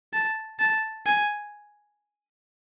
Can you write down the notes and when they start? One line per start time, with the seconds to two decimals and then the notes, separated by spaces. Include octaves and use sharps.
0.13 A5
0.59 A5
1.06 G#5